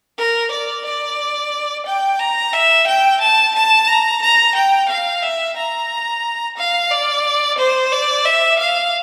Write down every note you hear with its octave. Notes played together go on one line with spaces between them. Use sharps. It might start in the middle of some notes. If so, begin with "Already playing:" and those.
A#4
D5
D5
G5
A#5
E5
G5
A5
A5
A#5
A#5
G5
F5
E5
A#5
F5
D5
C5
D5
E5
F5